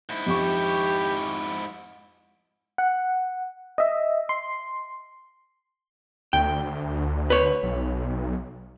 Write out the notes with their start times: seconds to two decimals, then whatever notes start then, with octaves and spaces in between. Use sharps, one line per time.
0.09 G#2 E4
0.27 F2 G4 C#6
2.78 F#5
3.78 D#5 E5
4.29 C6
6.33 D2 G5
7.30 B4 C#5
7.63 B1